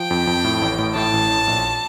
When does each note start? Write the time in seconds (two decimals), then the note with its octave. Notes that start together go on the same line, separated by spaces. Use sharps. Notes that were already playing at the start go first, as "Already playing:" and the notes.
Already playing: F3 G5
0.11 F2
0.27 F2
0.44 A2
0.62 A1
0.79 A2
0.95 A2 A5
1.13 A1
1.30 A1
1.47 A#1